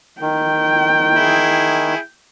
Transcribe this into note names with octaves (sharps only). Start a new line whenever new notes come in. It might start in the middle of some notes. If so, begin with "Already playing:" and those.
D#3 G5
E4 G#4